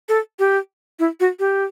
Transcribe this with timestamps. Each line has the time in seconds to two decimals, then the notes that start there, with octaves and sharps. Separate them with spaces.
0.09 A4
0.39 G4
0.99 E4
1.20 F#4
1.39 G4